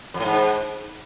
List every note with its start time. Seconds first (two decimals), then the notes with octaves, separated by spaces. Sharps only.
0.14 F2
0.20 A2
0.25 G#2